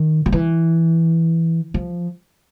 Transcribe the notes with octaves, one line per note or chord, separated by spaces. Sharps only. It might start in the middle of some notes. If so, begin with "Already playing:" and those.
Already playing: D#3
F3
E3
F3